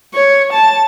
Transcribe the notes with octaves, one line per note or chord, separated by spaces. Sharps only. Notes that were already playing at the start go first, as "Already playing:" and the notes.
C#5
A5